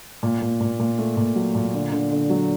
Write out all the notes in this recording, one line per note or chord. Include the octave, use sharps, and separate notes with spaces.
A#2
A#2
A#2
A#2
A3
A#2
F#3
A#2
D3
D3
D3
F#3